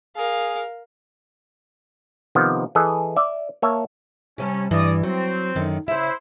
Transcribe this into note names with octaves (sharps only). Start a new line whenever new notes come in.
G#4 A#4 F5
C3 D#3 F3 B3
E3 G#4 A4 D#5
D5 E5
A#3 C#5 E5 A5
C3 G3 C#4 A5
G2 E3 D5 D#5 D#6
F#3 C4
F#2 D3 D#3
C#3 E4 C5 E5